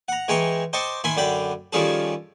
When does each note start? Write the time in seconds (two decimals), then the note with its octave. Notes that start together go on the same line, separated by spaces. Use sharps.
0.08 F#5 A#5
0.28 E3 G#3 G5 A#5 C#6
0.73 C5 D#5 G5 A5 C#6 D6
1.04 D#3 E5 G#5 B5 C6
1.17 F#2 D3 D5 G5 B5
1.73 D#3 F3 G3 C#4 G#4 A4